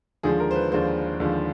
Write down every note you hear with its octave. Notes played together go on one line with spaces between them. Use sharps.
D#2 D3 F3 G#3 G#4
A#4
C5
B4
D#2 D3 F3 G#3 C5
D#2 D3 F3 G#3